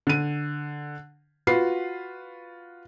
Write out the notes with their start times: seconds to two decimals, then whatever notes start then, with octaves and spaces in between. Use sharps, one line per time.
0.07 D3 D#7
1.47 F4 F#4 B4 C7